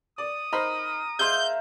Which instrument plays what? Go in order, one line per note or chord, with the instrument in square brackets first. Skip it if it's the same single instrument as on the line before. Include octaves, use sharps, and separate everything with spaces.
[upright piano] D5 [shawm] D#6
[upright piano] D#4 C5 B5 [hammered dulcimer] A#4
[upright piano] G#4 [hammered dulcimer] C5 E5 F5 [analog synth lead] G6